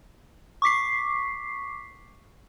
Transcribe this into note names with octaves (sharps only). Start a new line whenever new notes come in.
C#6 D6 B6 C7